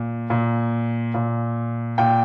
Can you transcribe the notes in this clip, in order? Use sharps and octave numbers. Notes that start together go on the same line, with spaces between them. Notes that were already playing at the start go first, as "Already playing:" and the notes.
Already playing: A#2
A#2
A#2
A#2 G5